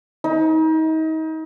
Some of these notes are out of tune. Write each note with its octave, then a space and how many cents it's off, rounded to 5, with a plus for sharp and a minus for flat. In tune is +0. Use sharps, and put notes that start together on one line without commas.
D#4 +35